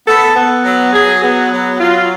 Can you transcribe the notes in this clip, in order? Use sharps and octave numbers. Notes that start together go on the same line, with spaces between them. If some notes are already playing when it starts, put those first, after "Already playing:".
B3 A4
B3
F#3
F#3 G#4
B3
F#3
F#3 F4